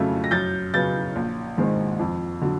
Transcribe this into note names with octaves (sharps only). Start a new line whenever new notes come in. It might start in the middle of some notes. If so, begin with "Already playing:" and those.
Already playing: F2 C#3 F#3 A3 C#4
A#6
F#2 G6 A6
C#3 F#3 B3 G6 A6
A#1
G#2 D#3 G#3 C4
F2
D3 F#3